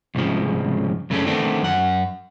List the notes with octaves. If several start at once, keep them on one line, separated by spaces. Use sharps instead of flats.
C2 G#2 C#3 F3
F#2 C#3 A3 A#3 C#4 D4
D#3 A3 B3 C4 D4
F#2 F#5